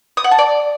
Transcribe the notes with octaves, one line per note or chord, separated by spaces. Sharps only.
D#6
F#5
A5
D5